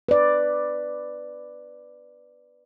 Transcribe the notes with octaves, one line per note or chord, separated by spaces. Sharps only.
B4 D5